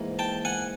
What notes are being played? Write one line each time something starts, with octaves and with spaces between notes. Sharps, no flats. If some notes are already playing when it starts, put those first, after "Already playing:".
Already playing: G#2 E3 A#3
G5 A5
F#5 G#5